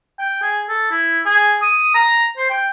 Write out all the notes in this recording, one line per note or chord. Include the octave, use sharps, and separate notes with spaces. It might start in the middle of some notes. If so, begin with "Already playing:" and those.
G5
G#4
A4
E4
G#4
D#6
A#5
C5
G5